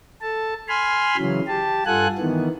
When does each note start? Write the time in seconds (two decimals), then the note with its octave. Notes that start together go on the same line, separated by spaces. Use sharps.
0.22 A4 A5
0.68 G#5 B5 C6 F6
1.17 C#3 E3 F#3
1.47 G4 A5
1.86 G2 F4 A4 F#5 G#5 F#6
2.18 D#3 E3 B3